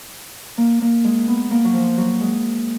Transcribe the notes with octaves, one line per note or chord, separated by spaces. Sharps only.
A#3
A#3
G#3
B3
A#3
F#3
F3
F#3
G#3